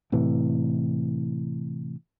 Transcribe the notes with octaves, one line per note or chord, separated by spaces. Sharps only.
A2 C3 E3